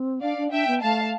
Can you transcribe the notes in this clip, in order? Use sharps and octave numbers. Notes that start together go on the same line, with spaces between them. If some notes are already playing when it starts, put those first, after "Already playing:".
Already playing: C4
D4 D5 F5
D4
D4 E5 G5
B3
A3 F5 A5